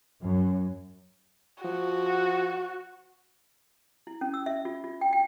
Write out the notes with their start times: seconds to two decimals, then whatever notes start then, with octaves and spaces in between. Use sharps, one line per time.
0.22 F#2
1.64 F3 F#4
4.07 E4
4.21 C#4
4.34 E6
4.46 E5
4.65 F4
4.84 F4
5.01 G5
5.13 G5